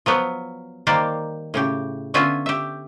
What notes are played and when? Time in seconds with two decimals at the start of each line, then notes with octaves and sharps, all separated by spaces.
0.06 F3 F#3 B3
0.87 D#3 G3 A#3 G4 C5 D5
1.54 A2 C#3 G4
2.14 D3 B3 C#4 F4 E5 G#5
2.46 G4 E5